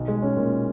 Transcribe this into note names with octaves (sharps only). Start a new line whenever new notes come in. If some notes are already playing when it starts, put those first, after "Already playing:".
Already playing: B1
G#3
C#4
A#2